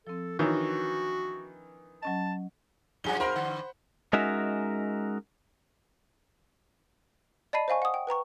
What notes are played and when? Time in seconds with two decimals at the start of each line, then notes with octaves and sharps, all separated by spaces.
0.07 F3 C4 A4
0.39 D#3 E3 D4 F#4 C#5
2.03 F#3 C#4 D#5 A5
3.04 B1 F#2 F3 D4 G#4 G#5 G7
3.20 A#4 C5 B5 C6
3.36 G2 D3 F#5
4.13 G#3 C#4 D#4 F#4 A#4 E5
7.53 D5 D#5 A5 B5 C7 D#7
7.68 C5 D#5 F5 G#5 C#6
7.82 F#5 D#6
7.94 G5
8.07 B4 G5 A#5 C#6